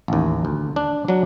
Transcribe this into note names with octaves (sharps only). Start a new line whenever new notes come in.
A1 D#2
D2
D4
F#3 D4